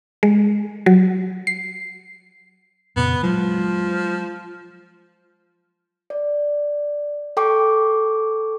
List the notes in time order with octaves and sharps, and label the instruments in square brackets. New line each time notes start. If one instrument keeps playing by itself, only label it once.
[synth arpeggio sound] G#3
F#3
C7
[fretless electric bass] F2 A#2 C#3 [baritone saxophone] B3
[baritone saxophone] F3 [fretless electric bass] F#3 G#3
[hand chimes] D5
A4 G5 C#6 D6